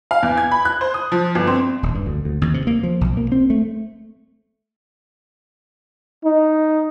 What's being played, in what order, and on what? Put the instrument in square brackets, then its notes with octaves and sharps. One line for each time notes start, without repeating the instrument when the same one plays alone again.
[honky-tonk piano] F5
E2
G#6
B5
F#6
C5
D#6
F3
G1
C4
[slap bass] D#1
G2
D2
D2
D#2
C3
A#3
F3
B1
A#3
C4
A3
[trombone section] D#4